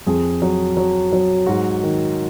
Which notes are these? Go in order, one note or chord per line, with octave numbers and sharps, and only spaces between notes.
F2 G#4
F#3
F#3
F#3
G#2 F#4
D#3